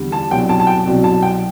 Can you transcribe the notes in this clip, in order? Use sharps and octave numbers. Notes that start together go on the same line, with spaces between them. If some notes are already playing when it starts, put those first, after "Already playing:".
Already playing: E2 D3 G3
A5
C2 B2 F#3 G5
A5
A5
G5
C2 B2 F#3
A5
G5